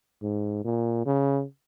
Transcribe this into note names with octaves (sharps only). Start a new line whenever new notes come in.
G#2
A#2
C#3